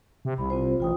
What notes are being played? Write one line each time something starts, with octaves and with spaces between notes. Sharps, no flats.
C3
C2 B5
C4 F4 C5
A1 F4 G5 D#6